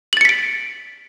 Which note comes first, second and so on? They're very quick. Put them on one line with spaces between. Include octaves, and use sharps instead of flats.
F#7 A6 C#7 B6 D7